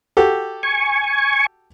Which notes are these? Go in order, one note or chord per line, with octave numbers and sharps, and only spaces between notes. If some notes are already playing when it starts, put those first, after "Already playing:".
F#4 G4 A4
G#5 C#6